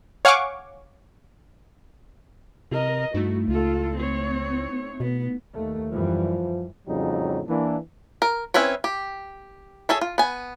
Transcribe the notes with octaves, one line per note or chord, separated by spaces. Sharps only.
C#5 F5 F#5 G#5 C#6 D6
C3 A#4 D#5
G2 A3 D#4 E4 F#4
C#2 F4 A4
C4 C#5
B2 B3
D#2 A3
F#2 E3 F3 G3
F2 A2 C#3 F#3 G3 D#4
E3 A#3 D4
A#4
C4 C#4 E4 B4 C#5
G4
G#4 A4 C#5 E5
F4
B3 G#5